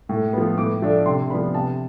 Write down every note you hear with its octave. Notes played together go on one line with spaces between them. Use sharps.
A2
F3 B3
A2 D6
F3 A3 D4
C3 C6
F3 B3 D4 B5
C3 A5